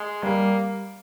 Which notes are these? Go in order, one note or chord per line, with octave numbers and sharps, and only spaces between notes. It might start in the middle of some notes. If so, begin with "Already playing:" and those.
Already playing: G#3
G3 A#3